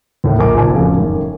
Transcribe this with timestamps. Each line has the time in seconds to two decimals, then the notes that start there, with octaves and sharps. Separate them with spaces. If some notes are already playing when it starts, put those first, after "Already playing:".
0.24 D#2 A2
0.39 A#1 A#4 G#5 D6
0.54 F#1 A#2 D#3 C5 G#5 A5
0.74 D1 F2 C#3 A4 F5
0.97 F#2 D#3